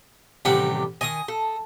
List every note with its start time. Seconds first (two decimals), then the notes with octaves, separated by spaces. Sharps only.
0.45 A1 C3 D#3 G3 G4 F#5
1.01 D#3 D#5 G#5 D#6
1.28 A4